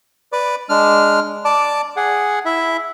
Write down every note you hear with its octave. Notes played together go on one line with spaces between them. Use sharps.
B4 D5 D6
G#3 D4 F6
D5 A5 D6
G#4 F#5
E4 E5